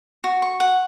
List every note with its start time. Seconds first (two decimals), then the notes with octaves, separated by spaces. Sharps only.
0.24 F#4
0.42 C#6
0.60 F#5